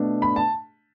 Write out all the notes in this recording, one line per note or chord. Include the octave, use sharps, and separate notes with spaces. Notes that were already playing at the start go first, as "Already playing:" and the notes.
Already playing: B2 A3 D4
B5
A5